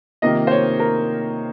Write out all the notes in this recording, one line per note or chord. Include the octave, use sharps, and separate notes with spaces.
C3 D#3 A#3 F4 D#5
C5
C#5
A#4